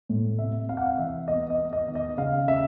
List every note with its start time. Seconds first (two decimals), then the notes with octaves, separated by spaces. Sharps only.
0.09 A2
0.39 C3 E5
0.69 C4 F5
0.77 F#5
0.86 F5
0.98 E3 E5
1.28 B3 D#5
1.50 D#5
1.58 B3
1.73 D#5
1.88 D#3
1.95 D#5
2.17 C#3 F5
2.48 C#3 E5